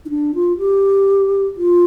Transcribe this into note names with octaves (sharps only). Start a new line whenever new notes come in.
D#4
D4
F4
G4
F4